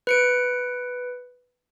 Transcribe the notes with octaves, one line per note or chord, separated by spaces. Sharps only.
B4 C#7 D7